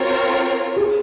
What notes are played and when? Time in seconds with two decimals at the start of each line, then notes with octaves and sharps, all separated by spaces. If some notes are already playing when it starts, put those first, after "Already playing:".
Already playing: C4 F4 F#4 A#4 C#5
0.76 G#4